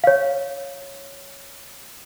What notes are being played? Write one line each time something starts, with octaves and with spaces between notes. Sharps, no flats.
C#5 F5